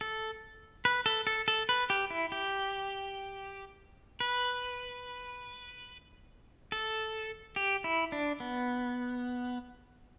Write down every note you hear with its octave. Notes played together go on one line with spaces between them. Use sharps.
A4
B4
A4
A4
A4
B4
G4
E4
G4
B4
A4
G4
E4
D4
B3